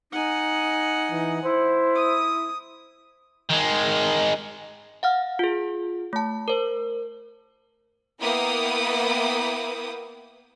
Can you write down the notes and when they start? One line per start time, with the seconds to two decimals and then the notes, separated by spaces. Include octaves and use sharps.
0.12 D#4 F#5 G#5
1.11 E3
1.43 E4 C5
1.95 D#6
3.49 D#3 G#3
5.03 F5 F#5 F6
5.39 F4 G#4
6.13 A3 A5
6.48 A#4 C5
8.21 A#3 B3 E4 B4 G5 D#6